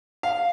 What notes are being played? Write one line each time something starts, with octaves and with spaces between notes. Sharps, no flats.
F5